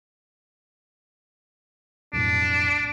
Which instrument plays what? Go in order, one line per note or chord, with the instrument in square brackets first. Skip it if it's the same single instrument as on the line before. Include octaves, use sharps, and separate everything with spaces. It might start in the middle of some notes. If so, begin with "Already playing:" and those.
[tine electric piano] B1 F2 A2 [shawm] D4